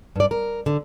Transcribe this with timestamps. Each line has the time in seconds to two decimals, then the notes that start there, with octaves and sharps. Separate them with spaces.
0.16 G2 D5
0.31 A#4
0.66 D3